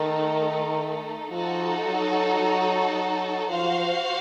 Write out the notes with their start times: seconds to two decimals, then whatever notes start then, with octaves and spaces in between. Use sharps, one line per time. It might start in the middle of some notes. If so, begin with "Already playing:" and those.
Already playing: D#3 A3 D#4 A4
1.31 F3 D#4 F#4 A4
1.86 F#3
2.40 F#3
2.94 F#3
3.49 F3 F#4 C5 F5